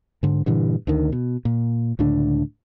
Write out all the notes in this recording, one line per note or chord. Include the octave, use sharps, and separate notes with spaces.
G#2 D3
G2 A#2 D3 E3
D2 D3 D#3
B2
A#2
C#2 A2 D3 D4